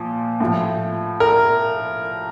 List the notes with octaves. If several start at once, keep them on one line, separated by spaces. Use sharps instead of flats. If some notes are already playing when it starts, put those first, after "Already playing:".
Already playing: A#2 F3
A2 F3
A#4